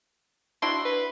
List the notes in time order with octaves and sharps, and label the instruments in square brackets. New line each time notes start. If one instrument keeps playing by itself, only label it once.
[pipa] D4 E4 F#4 [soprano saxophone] C6
[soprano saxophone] B4